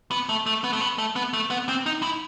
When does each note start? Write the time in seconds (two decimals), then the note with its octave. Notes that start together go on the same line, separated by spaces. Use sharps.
0.11 B3
0.29 A3
0.46 A3
0.64 B3
0.73 A3
0.80 B3
0.98 A3
1.16 B3
1.33 A3
1.51 B3
1.69 C4
1.86 D#4
2.03 E4